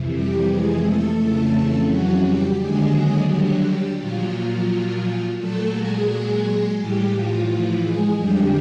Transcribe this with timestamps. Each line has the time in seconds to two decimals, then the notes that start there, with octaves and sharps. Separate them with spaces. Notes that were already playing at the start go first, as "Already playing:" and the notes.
Already playing: F2 C3 E3
0.13 G3 G4
0.48 G#3 G#4
0.82 A3 A4
1.17 F2 C#3 E3
1.87 F#3 F#4
2.23 G3 G4
2.57 D#2 D3 F#3 G#3 G#4
3.27 G3 G4
3.97 A#2 F3 F#3 F4
5.37 A#2 F#3 A3 A4
5.72 G#3 G#4
6.07 G#3 G#4
6.77 A2 E3 G3 G4
7.12 F3 F4
7.47 F3 F4
7.82 G#3 G#4
8.17 F2 D3 F3 G3 G4